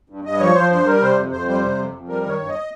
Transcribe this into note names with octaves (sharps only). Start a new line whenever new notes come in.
G2
G2 D#5
F3 C#5
F3 C5
G2 C5
G3 A#4
C3 C5
F2
F2 C5
G3 C5
C3
F2
F2
G3 A#4
D#3
C#5
G2
D#5